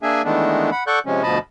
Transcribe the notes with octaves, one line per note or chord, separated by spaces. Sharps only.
A#3 D4 G#4 E5 G#5
D#3 E3 G#3 A3 B3 D4
F#5 B5
A4 D5 F#5 C#6 F#6 G6
C3 F3 G#3 C#4
D2 B2 F3 D#5 A5 B5